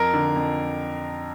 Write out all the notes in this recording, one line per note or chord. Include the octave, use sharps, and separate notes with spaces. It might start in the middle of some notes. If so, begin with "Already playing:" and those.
Already playing: F2 A#4
D3
F2